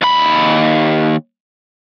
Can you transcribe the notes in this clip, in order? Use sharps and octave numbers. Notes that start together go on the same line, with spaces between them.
D#2 B5